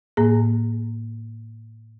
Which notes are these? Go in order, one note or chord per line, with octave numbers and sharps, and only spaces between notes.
A2 A#3 G#4